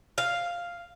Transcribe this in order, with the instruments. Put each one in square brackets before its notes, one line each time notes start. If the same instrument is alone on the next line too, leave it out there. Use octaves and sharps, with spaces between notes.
[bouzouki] F5